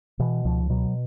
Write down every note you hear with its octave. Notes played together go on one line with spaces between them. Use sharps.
B2 E3
C#2 F3
B2 F#3